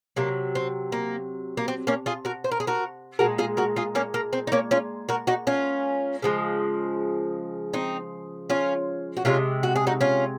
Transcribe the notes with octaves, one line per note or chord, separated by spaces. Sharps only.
C3 F#3 A#3
C4
A#3
A#3
C4
A#3 C#4
F4 G#4
F#4 A#4
C5
A#4
G#4
F#4 A#4
A#2 G#3 F#4 A#4
F4 G#4
F#4 A#4
F4 G#4
A#3 C#4
A#3
C4
D#4
A#3 C#4
C#4 F4
F#4 A#4
D#4 F#4
C#4 F4
C#3 F3 G#3
C4 D#4
C#4 F4
F#4
C3 D#3 G#3 C#4 F4
F#4
G#4
D#4 F#4
C#4 F4